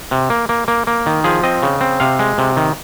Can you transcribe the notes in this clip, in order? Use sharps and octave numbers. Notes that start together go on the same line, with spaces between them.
C3
A#3
A#3
A#3
A#3
D#3
F3 G#4
C4 D#5
C#3
C4
C3 F5
G#3
C3
D#3